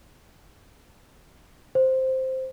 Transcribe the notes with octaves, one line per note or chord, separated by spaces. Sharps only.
C5